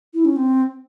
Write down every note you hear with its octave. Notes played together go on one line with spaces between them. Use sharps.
E4
C#4
C4